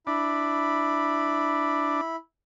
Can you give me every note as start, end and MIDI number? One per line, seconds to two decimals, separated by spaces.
0.07 2.01 62
0.07 2.16 64
0.07 2.16 83